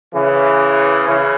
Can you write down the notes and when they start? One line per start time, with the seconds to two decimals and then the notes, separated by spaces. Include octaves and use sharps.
0.14 C#3 E3
1.07 C#3 E3